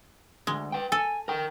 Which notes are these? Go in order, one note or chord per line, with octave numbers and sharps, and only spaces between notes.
D2 G#3
B4 G5
A4 G#5
A#4 G5